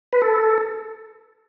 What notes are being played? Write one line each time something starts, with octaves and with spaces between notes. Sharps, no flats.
B4
A4